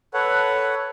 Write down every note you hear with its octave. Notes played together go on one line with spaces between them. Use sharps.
A4 B4 C#5 F#5